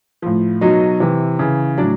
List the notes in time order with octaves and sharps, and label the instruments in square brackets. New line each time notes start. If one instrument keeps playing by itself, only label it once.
[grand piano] A2 F3
B2 F#3 D#4 D#5
C3 E3
C#3 E3
A2 F#3 D4 D5